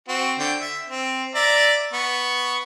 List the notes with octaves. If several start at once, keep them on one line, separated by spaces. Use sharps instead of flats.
C4 F#4
D3 G5
E5
C4
D5 E5 A#5
B3 C#6